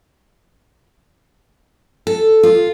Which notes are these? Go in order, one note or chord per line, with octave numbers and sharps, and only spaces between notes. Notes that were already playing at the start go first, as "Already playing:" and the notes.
A4
F4